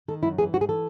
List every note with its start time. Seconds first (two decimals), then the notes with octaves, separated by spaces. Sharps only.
0.08 D#3 A4
0.23 F#2 E4
0.38 E3 G#4
0.53 G#2 F#4
0.61 G#4
0.69 E3 A4